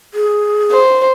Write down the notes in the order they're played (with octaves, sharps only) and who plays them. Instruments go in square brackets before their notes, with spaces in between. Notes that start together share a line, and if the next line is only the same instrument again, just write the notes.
[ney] G#4
[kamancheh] C5